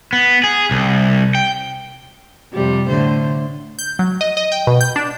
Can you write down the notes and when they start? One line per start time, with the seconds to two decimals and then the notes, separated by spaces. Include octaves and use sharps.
0.13 B3
0.44 G#4
0.71 C2
1.35 G5
2.53 F2 C3 G3
2.89 A2 D3 C5
3.79 G6
3.99 F#3
4.21 D#5
4.37 D#5
4.52 G5
4.67 B2
4.81 G6
4.96 D4